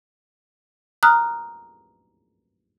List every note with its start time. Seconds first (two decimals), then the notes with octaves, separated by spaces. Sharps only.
1.03 A#5 D#6 F6 F#6